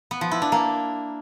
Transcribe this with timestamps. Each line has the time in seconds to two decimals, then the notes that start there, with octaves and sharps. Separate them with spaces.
0.11 B3
0.21 F3
0.31 E4
0.42 D4
0.52 A#3